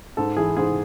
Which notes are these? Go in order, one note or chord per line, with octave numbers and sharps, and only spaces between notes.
G#2 A4
E3 G#4
G#2 G#4